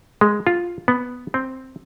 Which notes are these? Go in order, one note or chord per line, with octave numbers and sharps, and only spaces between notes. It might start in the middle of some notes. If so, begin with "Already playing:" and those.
G#3
F4
B3
C4